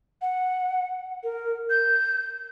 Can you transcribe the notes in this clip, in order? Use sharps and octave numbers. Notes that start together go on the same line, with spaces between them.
F#5
A#4
G6